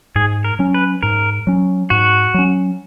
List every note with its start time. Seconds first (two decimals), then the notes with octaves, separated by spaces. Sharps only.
0.16 G#2 G#4
0.44 A#4
0.59 F#3 C#4
0.74 B4
1.03 G#2 A#4
1.47 F#3 C#4
1.90 G#2 F#4
2.34 F#3 C#4